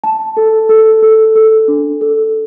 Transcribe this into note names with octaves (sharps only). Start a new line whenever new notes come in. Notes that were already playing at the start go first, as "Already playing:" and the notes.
A5
A4
A4
A4
A4
D4
A4